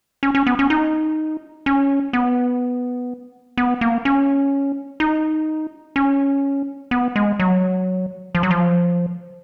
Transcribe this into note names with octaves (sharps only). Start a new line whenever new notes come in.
C#4
C#4
B3
C#4
D#4
C#4
B3
B3
A#3
C#4
D#4
C#4
B3
G#3
F#3
F3
F#3
F3